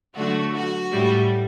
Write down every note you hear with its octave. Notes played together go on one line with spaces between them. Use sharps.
D3 F#3 A3 F#4
F#4
A2 G3